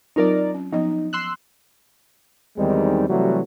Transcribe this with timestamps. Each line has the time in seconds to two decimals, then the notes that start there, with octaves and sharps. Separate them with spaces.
0.16 F#3 C4 D#4 F4 A#4 D5
0.54 C#4
0.73 F3 B3 D#4 D#5
1.13 C6 E6 F#6
2.57 E2 D#3 G3 G#3 C4 D#4
3.09 C3 E3 F#3 G3 A3 F#4